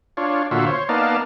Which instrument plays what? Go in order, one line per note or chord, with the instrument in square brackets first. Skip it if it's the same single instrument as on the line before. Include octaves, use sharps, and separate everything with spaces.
[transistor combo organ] D4 F4 C#5
A#2 D3 F4 F#4 E5
C5 C#5
A#3 B3 D#4 D5 F5 A5